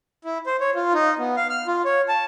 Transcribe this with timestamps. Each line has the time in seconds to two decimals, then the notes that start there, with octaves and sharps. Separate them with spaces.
0.25 E4
0.46 C5
0.60 C#5
0.75 F4
0.94 D#4
1.19 B3
1.36 F5
1.50 F6
1.67 F4
1.85 C#5
2.08 A5